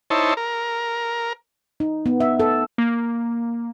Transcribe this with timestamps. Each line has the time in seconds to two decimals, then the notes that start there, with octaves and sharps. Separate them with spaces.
0.10 D#4 E4 C5 C#5 A5
0.37 A#4
1.80 D#4
2.06 B3
2.20 E5
2.40 A4
2.78 A#3